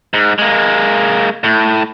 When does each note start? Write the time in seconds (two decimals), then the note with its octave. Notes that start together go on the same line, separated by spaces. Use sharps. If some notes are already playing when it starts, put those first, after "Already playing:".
0.14 G#2
0.39 G#3 A#3
1.44 A2